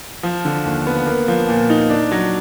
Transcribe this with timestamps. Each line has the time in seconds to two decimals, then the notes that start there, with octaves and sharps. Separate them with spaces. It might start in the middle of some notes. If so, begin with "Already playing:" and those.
0.23 F3
0.45 D3
0.65 D#2
0.87 B3
1.06 A#3
1.28 F3
1.49 A#2
1.70 D#4
1.90 D4
2.12 F#3